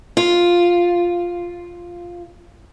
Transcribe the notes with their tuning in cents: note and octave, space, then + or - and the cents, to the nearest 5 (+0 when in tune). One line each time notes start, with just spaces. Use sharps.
F4 +0